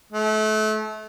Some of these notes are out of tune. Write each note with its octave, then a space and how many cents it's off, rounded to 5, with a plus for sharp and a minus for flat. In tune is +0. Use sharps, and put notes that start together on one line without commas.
A3 -30